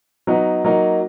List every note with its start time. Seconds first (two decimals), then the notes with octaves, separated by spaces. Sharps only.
0.27 F#3 B3 D#4
0.64 F#3 A#3 D#4